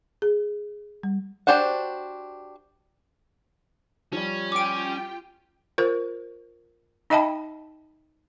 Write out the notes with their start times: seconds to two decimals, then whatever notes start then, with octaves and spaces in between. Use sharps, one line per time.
0.22 G#4
1.03 G3
1.47 D4 F#4 G4 C5 F#5
4.13 F3 G3 C#4
4.52 F4 G4 G5 D6 D7
5.78 F4 A#4 C5
7.10 D#4 D#5 E5 G5 A5 B5